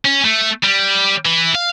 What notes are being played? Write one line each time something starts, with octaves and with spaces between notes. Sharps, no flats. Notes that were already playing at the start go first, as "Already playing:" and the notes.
C#4
A3
G3
E3
F5